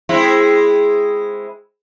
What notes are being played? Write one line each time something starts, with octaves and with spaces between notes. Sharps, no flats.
G#3 C4 E4